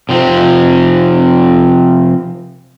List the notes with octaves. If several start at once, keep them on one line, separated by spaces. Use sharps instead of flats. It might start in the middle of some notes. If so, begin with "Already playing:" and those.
C3 F3 C4